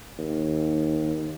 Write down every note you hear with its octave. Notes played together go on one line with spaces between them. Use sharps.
D#2